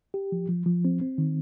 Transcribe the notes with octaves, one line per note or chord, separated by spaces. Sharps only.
G4
F3
F3
F3
C4
C4
D#3